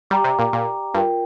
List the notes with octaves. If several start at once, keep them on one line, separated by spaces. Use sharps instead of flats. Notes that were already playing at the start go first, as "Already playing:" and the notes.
G3 G4 D5 G5 A#5 D6
C3
A#2
A#2
G2 F4 A#4 G5